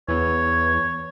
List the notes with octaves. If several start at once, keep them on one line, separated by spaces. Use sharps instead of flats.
E2 E3 B4 C#5